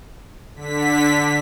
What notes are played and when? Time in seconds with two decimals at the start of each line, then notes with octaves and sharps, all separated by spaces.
0.56 D3 B6